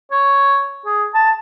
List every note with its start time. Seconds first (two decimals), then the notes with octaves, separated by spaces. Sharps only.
0.11 C#5
0.86 G#4
1.15 A5